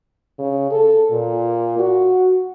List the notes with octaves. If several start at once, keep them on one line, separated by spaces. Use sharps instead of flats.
C#3
A4
A#2
F#4